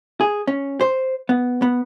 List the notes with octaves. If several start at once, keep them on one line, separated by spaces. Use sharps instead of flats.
G#4
C#4
C5
B3
B3